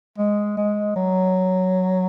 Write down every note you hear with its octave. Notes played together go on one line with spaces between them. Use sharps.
G#3
G#3
F#3